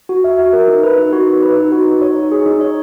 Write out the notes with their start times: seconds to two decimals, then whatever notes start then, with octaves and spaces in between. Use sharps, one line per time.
0.09 F#4
0.24 E5
0.39 F#4
0.53 A#4
0.68 D#4
0.83 B4
0.98 D#4
1.13 F#4
1.28 D#4
1.42 B4
1.57 D#4
1.72 F#4
1.87 D#4
2.02 C#5
2.16 D#4
2.32 G#4
2.46 D#4
2.61 C#5